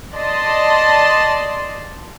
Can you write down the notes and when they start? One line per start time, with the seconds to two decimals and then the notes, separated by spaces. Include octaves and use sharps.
0.16 D5 D#5 A5 C6